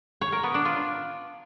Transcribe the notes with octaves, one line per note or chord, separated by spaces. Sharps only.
C#5
A#4
B3
D4
F4